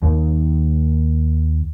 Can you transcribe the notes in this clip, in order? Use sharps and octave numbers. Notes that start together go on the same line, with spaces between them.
D#2 D#3 A#3